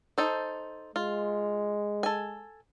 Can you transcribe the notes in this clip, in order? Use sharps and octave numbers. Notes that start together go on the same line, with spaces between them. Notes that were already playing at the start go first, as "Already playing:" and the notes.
D#4 A4 C5
G#3 F4
A4 G#5